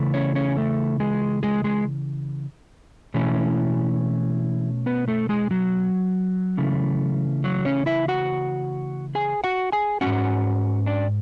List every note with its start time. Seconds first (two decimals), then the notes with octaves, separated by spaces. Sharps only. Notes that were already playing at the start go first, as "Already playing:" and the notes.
Already playing: C#3 E3 A3
0.14 C#4 C#5
0.35 C#4 C#5
0.57 A3 A4
1.00 G#3 G#4
1.43 G#3 G#4
1.64 G#3 G#4
3.14 B2 E3 A3 C#4 E4
4.86 B3 B4
5.08 A3 A4
5.29 G#3 G#4
5.51 F#3 F#4
6.57 C#3 E3 A3 C#4
7.44 F#3 F#4
7.65 C#4 C#5
7.86 E4 E5
8.08 F#4 F#5
9.15 G#4 G#5
9.44 F#4 F#5
9.72 G#4 G#5
10.01 G#3 C#4 F#4 F#5
10.06 G#2
10.86 D4 D5